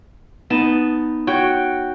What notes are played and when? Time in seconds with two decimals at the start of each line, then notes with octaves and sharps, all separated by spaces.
0.50 B3 D#4 A5
1.27 F#4 C#5 G5